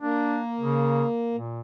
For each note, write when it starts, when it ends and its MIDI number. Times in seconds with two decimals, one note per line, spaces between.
0.01 1.36 58
0.01 0.39 62
0.60 1.05 49
1.34 1.61 46